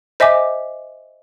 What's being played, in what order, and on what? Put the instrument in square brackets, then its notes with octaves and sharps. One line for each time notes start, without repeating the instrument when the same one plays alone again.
[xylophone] C5 D#5 E5 G#5 D6